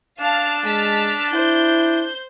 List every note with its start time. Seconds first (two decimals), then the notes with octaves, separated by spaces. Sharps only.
0.20 D4 F5 A5 F6
0.65 G#3 A5 F6 B6
1.33 E4 C5 G6